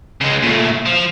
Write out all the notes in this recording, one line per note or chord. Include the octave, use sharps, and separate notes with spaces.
C#3 G#3
A#2 A3
F3